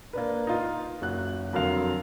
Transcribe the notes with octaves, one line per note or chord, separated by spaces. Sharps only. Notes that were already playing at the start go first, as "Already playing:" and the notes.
A#3 D4 B4
D#4 F4
F#1 F#4 F#6
F2 D3 F#3 A#4 F5 F7